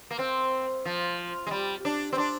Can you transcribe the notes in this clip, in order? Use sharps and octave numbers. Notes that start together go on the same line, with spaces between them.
A#3
C4
F3
G#3
G3
D4
C4
D4